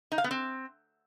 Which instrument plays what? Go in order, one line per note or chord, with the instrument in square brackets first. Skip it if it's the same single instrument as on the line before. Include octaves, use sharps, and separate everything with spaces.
[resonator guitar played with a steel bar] D#4
F5
B3
C4